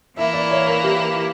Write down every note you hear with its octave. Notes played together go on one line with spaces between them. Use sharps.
E3 A#3 E4 E5
D5
C#5
A#4
G4